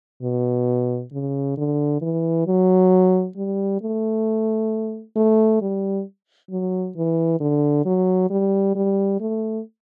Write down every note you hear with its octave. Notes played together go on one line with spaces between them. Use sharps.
B2
C#3
D3
E3
F#3
G3
A3
A3
G3
F#3
E3
D3
F#3
G3
G3
A3